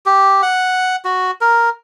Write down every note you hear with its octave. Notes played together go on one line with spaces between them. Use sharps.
G4
F#5
F#4
A#4